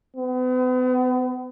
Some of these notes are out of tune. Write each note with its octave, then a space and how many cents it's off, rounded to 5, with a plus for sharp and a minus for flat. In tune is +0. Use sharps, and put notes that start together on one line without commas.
B3 +40